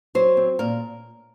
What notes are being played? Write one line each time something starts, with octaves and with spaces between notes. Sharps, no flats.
F#3 C5
C4
A#2 A#4